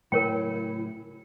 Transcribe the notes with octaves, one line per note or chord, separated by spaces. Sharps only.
A2 C#3 F#3 E4 A#4 C#5 G5